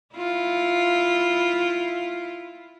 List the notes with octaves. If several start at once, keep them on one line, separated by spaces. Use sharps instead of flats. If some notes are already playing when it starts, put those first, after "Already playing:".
E4 F4